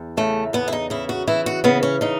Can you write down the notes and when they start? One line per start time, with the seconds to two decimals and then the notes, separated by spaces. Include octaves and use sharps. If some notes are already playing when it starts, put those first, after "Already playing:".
Already playing: E2
0.17 C#3 A3
0.53 E2 B3
0.68 E4
0.73 D#4
0.90 C#3 E4
1.09 F#4
1.27 E3 E4
1.46 F#4
1.64 C#3 B3
1.83 C#4
2.01 C#3 D#4